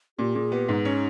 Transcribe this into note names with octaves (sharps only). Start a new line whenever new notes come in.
A#2 G4
A#2 G#4
B3 G4
G#2 D#4
C#4